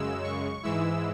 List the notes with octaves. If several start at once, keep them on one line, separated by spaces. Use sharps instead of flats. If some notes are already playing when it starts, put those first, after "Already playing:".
Already playing: F#2 C#3 G#3 E6
C#6
G#2 E3 G#3 E4 E6